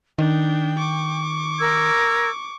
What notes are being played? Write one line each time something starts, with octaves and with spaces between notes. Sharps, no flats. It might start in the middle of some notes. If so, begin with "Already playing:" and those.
D#3 D4 D#4 G5
C#6 D6
A#4 E6 G#6